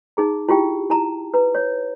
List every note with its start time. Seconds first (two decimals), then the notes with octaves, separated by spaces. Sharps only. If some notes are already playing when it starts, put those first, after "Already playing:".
0.17 D#4 G#4 A#5
0.49 E4 F4 G4 G5
0.90 E4 A5 A#5
1.34 B4 A#5
1.55 C#5